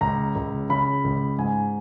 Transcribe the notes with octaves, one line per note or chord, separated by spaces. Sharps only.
C#2 A#5
C#2
C#3 B5
C#2
G#2 G#5